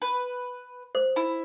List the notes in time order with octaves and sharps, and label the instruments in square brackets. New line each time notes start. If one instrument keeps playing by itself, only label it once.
[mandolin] B4
[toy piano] C5
[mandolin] E4